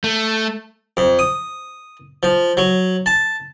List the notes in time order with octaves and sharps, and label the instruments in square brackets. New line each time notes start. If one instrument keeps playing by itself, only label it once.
[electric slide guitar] A3
[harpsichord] F2
D#6
F3
F#3
A5